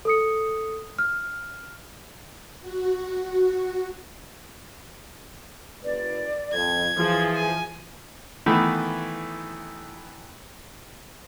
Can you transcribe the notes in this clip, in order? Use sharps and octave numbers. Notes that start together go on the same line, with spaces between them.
A4 D#6 C#7
F6
F#4
F#1 B4 D5
F2 G#6
E3 F3 G#4
G#5
D#3 E3 A3 B3 E4